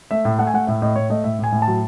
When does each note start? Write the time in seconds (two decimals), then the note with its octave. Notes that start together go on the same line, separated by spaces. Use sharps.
0.11 A3 E5
0.25 A2
0.39 A3 F#5
0.47 G#5
0.54 A3 F#5
0.67 A2 E5
0.82 A2 D#5
0.96 A2 C#5
1.10 A3 D#5
1.24 A2 E5
1.39 A2
1.44 G#5
1.52 A2
1.62 A5
1.68 F#3